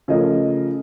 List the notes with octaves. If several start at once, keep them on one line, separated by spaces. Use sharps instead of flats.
C#3 F3 A3 A#4 D#5